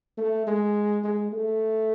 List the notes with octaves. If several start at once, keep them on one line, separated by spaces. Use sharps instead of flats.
A3
G#3
G#3
A3